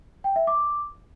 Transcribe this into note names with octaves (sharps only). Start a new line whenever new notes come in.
G5
E5
D6